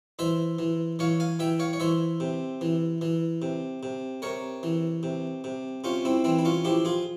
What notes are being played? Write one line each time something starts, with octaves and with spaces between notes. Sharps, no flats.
E3 C5 E5
E3
E3 C#5 F5
F5 G#5
E3 E5 G5
C#5 F5
C#5
E3 C5 E5
C3
E3
E3
C3
C3
C3 A#4 C#5
E3
C3
C3
C3 C#4 F4
C4 E4
E3 C4 E4
E4
C#4 F4
F3 E4 G4
F4 G#4